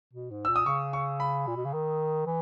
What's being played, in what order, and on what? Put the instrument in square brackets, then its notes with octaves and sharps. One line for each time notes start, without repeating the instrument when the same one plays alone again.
[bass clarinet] B2
G#2
[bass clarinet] A#2 [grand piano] E6
[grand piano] D#6
[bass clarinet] C#3 [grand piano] C#6
[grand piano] C#6
B5
[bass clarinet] A#2
B2
C#3
D#3
E3